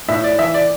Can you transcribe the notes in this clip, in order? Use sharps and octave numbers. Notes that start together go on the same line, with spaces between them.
A2 E5
D5
E3 E5
D5